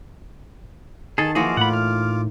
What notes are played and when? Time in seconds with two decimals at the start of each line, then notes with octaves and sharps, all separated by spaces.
1.18 D#3 G#4 A4 A5
1.35 E3 F3 A#3 D#4 F4 F#4 G#4 D6
1.57 A2 F#5 B5
1.73 F6